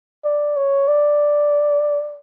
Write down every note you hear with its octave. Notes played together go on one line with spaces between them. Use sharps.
D5
C#5
D5